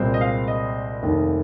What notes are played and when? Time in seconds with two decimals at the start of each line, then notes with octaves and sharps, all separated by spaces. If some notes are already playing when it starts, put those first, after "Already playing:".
Already playing: C2 A#2 G#3 C4
0.14 D#5
0.21 F5
0.48 D#5
1.02 F1 D#2 D#3